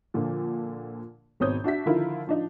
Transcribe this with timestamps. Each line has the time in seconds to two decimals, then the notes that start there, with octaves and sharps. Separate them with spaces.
0.14 A#2 D3 F3
1.40 G#1 B2 C4 C#5 D#6 G6
1.64 D4 F#4 E5 B6
1.86 D3 D#3 F3 E4 F4 A#4
2.27 F3 D4 D#4